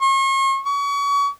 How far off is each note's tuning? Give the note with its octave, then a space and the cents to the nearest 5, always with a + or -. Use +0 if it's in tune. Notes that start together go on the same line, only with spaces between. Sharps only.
C#6 -40
C#6 +35